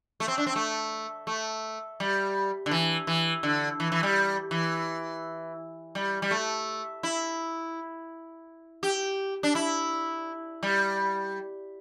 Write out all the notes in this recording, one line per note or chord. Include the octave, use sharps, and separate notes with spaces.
A3
C4
D4
C4
A3
A3
G3
D3
E3
E3
D3
E3
E3
G3
E3
G3
G3
A3
E4
G4
D4
E4
G3